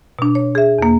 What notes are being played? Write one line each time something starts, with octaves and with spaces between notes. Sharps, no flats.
B2 D4
C#5
G#4 E5
E2 A#3